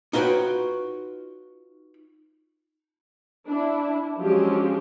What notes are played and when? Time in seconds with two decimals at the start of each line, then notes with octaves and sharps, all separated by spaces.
0.13 D#4 F4 F#4 B4 C#5 G5
3.46 D4 E4
4.17 F3 F#3 G#3 C#4 D4 G4